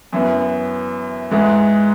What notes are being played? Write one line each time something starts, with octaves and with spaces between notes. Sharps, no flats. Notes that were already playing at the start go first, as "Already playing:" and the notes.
F#2 E3 B3
G#2 E3 G#3